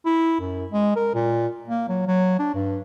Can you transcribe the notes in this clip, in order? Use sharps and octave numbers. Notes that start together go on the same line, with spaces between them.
E4
F#2
G#3
A#4
A#2
A#3
F#3
F#3
D4
G2